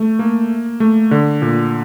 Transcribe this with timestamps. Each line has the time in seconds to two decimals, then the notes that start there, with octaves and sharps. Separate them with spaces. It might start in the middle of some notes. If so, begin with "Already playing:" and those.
Already playing: A3
0.19 A#3
0.80 A3
1.11 D3
1.42 A#2